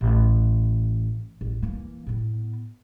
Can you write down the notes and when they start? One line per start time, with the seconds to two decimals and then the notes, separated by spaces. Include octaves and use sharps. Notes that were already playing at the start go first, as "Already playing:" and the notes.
0.01 A1
1.41 A1
1.62 E3 A#3
2.07 A2 B3